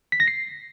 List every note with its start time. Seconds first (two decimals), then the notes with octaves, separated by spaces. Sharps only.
0.12 B6
0.20 A#6
0.28 C7